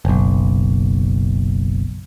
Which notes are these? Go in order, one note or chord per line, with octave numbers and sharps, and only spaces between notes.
F#1 B1